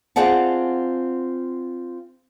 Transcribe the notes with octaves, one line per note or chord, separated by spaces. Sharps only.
C4 F4 G#4 D5 F#5 A5